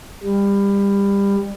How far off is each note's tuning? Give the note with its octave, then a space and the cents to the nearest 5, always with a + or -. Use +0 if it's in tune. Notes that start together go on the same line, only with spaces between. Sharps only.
G3 +25